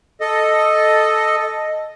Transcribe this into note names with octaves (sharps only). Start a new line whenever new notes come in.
A4 D#5